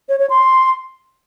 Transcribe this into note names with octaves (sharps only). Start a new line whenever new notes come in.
C#5
C#5
C6